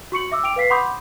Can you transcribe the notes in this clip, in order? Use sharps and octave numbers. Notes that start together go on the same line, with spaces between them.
F#4 C#6 C#7 F#7
E5 D6 E6
G5 D6 D7 F7
B4 F5 B6 C7
F#5 B5 C6 D6 D#6 G6